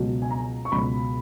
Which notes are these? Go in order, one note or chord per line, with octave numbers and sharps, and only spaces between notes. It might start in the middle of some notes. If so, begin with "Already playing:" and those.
Already playing: C#2 B2 F#3
G#5
A#5
C#6
C#2 B2 F#3 B5